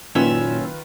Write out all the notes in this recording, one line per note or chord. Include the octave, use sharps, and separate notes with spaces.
F#1 A#2 D#3 C#4 F4 B4 E5 E6